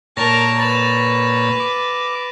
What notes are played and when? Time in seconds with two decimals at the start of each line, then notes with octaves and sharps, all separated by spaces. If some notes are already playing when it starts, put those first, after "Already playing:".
0.17 A#2 A#4 C#5 A5 A#6 F7
0.60 B4 A6 E7
1.60 D6